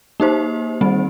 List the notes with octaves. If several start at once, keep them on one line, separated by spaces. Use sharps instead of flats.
A#3 D#4 G4 C5
D#3 G3 C4